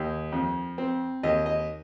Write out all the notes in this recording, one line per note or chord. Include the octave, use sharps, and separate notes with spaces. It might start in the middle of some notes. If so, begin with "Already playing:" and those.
Already playing: D#2
F2
C4
D#2 D#5
D#5